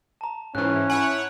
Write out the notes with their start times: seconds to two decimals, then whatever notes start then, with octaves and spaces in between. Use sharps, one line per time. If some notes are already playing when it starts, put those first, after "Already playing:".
0.21 A5 A#5
0.55 G#2 E3 C#4 F#6
0.90 E4 C#5 F#5 G#5